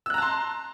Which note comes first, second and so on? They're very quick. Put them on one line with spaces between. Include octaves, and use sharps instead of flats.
E6 F#6 A#5 A5 C6